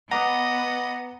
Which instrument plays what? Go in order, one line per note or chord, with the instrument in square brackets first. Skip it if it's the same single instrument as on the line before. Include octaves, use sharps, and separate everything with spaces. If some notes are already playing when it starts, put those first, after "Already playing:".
[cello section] B3 [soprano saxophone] D#5 [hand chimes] F#5 D6 D#6 [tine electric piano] A#5